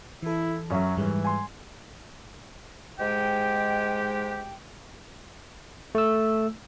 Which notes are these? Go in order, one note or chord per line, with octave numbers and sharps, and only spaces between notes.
E3 E4 A4
F#2 F#3 C#4 E5
G#2 E3 G3 G#3
G#5 C6
G#2 G#3 G4 G5
A3 E6